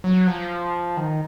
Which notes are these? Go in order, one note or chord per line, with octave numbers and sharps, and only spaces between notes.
F#3
F3
D#3